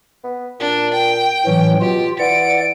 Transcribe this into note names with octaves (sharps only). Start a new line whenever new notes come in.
B3
A#2 D4
G5
A2 E3 F#3 C#4
B2 F4 G4
E3 D5 F#5 D7